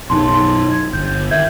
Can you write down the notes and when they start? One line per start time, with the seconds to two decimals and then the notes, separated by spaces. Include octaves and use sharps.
0.10 B1 F#2 D#4 A5 C6
0.71 G#6
0.93 G1 G6
1.31 D#3 E5 G6 G#6